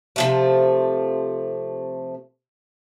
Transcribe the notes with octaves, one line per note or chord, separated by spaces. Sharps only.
C3 F3 A3